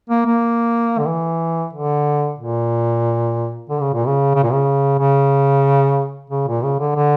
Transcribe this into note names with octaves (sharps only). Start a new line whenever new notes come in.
A#3
A#3
D3
E3
D3
A#2
D3
C#3
A#2
C#3
C#3
A#2
C#3
C#3
C#3
A#2
C#3
D3
D3